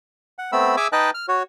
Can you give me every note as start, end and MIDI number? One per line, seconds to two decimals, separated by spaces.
0.39 0.51 78
0.52 0.76 57
0.52 0.76 59
0.52 0.76 60
0.52 0.76 83
0.52 0.76 88
0.77 0.87 68
0.77 0.87 76
0.77 0.87 80
0.77 0.87 86
0.77 0.87 88
0.92 1.10 63
0.92 1.10 71
0.92 1.10 75
0.92 1.10 79
0.92 1.10 81
0.92 1.10 90
1.14 1.26 89
1.28 1.43 66
1.28 1.43 73